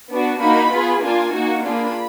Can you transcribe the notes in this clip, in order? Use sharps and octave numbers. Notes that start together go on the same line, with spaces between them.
B3 D4 F#4
A#3 D#4 F#4 B5
B3 F4 G#4
A#3 D4 F4 G#5
A#3 D#4 F#4
A#3 D4 F4 G#4 B5